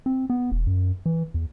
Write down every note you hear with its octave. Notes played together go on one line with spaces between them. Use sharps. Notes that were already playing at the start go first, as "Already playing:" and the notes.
C4
B3
E1
F#2
E3
E2